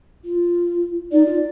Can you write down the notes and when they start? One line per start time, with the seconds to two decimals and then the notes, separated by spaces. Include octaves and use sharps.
0.25 F4
1.12 D#4 D5
1.26 F4